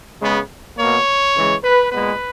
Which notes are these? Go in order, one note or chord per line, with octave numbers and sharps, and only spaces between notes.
C#3 G#3 B3
B2 A#3 C#5
C#3 E3 G#3
B4
A#2 G#3 B3 B4